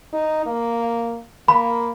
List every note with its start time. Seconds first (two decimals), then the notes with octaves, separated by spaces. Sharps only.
0.13 D#4
0.46 A#3
1.48 A#3 B5